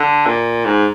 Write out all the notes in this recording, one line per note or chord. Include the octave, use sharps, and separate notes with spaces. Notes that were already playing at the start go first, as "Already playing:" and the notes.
Already playing: D3
A#2
G#2